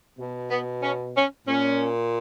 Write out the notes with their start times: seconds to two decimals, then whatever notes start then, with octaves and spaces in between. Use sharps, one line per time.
0.18 B2
0.49 B3
0.82 C#4
1.15 C#4
1.47 A#2 C#4